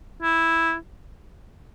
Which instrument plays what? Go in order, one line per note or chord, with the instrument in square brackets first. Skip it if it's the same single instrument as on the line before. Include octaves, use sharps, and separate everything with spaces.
[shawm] E4